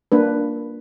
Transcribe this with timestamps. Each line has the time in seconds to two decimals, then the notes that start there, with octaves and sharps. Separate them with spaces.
0.12 A#3 D4 B4